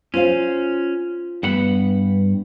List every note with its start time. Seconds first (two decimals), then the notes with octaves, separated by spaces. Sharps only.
0.14 C#4 F4 C5 F5
1.43 G2 B3 F#5 B5